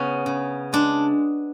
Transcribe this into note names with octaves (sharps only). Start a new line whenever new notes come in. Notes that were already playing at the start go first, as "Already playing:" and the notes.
Already playing: C#3 B3 C#4
C#3
G#3 D4